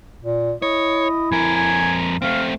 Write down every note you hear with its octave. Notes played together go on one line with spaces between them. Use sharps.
A#2
E4 C#5 D#5
F2 A#4 G#5
G#5
A3 C4 F5